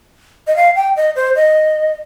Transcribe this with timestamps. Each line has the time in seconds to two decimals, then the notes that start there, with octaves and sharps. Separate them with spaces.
0.47 D#5
0.56 F5
0.75 G5
0.96 D#5
1.16 C5
1.36 D#5